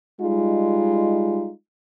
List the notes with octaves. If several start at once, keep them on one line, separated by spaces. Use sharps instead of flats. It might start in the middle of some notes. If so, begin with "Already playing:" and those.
G3 G#3 D#4 F4